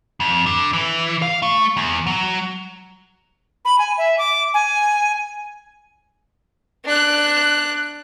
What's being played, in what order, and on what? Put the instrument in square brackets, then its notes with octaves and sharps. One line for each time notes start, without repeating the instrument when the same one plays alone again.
[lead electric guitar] F2
D3
E3
F5
A3
E2
F#3
[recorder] B5
G#5
E5
D6
G#5
[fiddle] D4 F#6